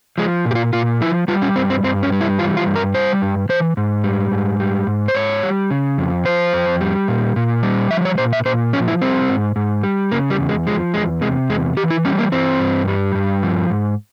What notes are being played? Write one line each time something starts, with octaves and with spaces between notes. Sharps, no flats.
F3 G#3
A#2
G4
F4
A#2 F4
F3 E4
G3 F4
C#4
G2 C4
C4
G2 C4
C#4
G3
E4
E3 F4
F4
G2
A#4
G3 C5
G2
E3 C5
G#2
G3
G#2
G3
G#2
C5
G#2 C#5
G3
C#3
F2
F3 C5
F2
G3
A#2
A#2
G3
F3 E5
C#5
A#2 C5
E5
A#2 C5
F3 C#4
E4
G3 C4
G#2
G#2
G3
C#3 A#3
G3
E2
G#3
F3 G#3
E2 G#3
C3 G#3
E2 G#3
E3 G4
E4
G3 C#4
A#3
E3 C4
G2
G3
G2
F3
G#2